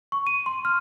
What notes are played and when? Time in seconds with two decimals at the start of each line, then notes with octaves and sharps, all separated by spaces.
0.12 C#6
0.27 D#7
0.46 C6
0.65 F6